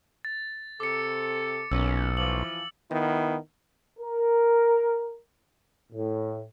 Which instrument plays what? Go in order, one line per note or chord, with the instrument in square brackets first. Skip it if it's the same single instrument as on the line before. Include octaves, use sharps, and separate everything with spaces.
[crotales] A6
[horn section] C3 A4 [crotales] D6 C#7
[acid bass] B1 [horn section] A#2 C#4 [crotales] E6
[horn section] E3 F3 [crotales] F#7
[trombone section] D#3 B3 E4
A#4
A2